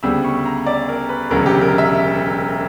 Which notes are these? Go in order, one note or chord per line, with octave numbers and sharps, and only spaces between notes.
D2 C#3 G3 B3 E6
C#6
A#5
D5
A#4
B4
E1 D2 C#3 F#3 A#4
G4
A#4
E5